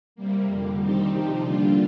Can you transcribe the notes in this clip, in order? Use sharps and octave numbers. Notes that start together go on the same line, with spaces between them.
C3 G3 A#3
F2 D3 G3 A#3
D#3 G3 C4 D#4 G4
C3 F3 C4 D#4 G4
D3 G3 A#3 D4 F4